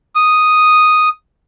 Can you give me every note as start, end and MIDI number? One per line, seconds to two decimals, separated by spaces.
0.15 1.09 87